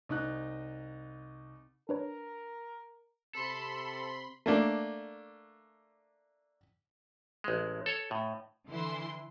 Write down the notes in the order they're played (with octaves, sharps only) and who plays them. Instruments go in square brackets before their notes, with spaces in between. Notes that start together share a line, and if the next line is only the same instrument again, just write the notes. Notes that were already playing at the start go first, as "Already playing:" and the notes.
[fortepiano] C2 D#4 F#6
[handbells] D4 B4 C#5 [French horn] A#4
[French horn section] C3 [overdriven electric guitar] A4 [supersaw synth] B5 C6
[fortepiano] A3 A#3 D4
[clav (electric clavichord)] A1 G#3
A4 C#5
A2
[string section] D3 E3 E4 C6